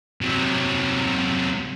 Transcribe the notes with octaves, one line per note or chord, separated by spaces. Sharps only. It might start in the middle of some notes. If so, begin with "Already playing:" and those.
C3 F#3